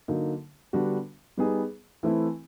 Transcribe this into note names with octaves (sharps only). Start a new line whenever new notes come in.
D3 F#3 A#3 D#4
D3 G3 B3 D4 F#4
G3 B3 D#4 G#4
E3 A3 C4 E4